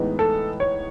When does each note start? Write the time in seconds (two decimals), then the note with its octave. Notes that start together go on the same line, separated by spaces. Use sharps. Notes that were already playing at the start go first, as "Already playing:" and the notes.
Already playing: A2 E3 G#3 B3 D#4
0.19 A4
0.60 C#5